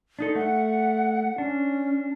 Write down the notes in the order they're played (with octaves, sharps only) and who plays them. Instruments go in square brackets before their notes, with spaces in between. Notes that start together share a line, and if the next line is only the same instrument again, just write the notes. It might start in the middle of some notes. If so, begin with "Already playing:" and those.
[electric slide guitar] D4 D#4 A4
[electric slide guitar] A3 [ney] F#5
[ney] C#4 [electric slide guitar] D4